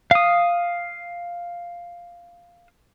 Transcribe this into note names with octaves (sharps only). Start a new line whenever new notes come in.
F5 D#6